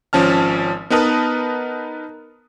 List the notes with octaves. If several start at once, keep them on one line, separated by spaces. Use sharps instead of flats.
G#1 F3 C#4 A5 F6
B3 D#4 A#4 B4 A5 D#6